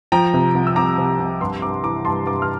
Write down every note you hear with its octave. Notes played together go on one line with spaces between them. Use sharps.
F3 G5 A#5
C3
C2
E6
C2 A#5 D6
C3
C2
G2 C6 E6
G2 A#5 D6
E3 A#5 D6
G2 A5 C6
G2 A#5 D6
F6